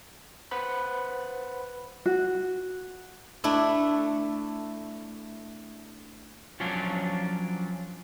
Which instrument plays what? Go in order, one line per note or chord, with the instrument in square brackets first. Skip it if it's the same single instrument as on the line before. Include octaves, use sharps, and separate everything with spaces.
[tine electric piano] B4 C5 F#5 B5
[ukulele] F#4
[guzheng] A3 D4 E4
[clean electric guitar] F3 F#3 C#4 D4 F4 C#5